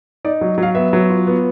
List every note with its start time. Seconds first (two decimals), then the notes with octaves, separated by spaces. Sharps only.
0.25 D#4 D5
0.41 F#3
0.58 F#3 F5
0.75 B3 E5
0.93 F#3
1.10 F4
1.27 B3